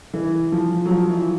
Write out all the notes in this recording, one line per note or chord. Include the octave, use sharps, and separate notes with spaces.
E3
F3
F#3
F3
E3